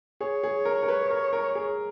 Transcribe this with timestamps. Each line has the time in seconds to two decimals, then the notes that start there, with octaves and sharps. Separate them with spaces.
0.21 G#4 C#5
0.43 G#4
0.65 A#4
0.83 A#4
0.88 B4
1.10 A#4
1.33 A#4
1.55 G#4